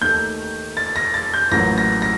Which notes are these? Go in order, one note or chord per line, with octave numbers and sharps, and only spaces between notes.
D#2 D#3 A3 G6
A6
A#6
A6
G6
A1 A2 F#3 A#3 A#6
A#6
A#6